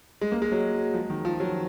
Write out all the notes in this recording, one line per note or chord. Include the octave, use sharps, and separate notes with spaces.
G#3
A#3
G#3
F#3
F3
D#3
F3
F#3